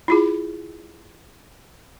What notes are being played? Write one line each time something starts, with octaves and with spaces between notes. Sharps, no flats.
E4 F4 G#4